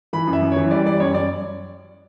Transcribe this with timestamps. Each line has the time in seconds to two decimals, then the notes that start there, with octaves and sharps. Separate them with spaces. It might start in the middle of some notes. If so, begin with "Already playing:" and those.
0.13 E3 B5
0.27 F#2
0.33 E5
0.42 F#2
0.52 E3 C#5
0.71 G3 D5
0.86 G3 D5
1.00 F#2 C#5
1.14 F#2 D5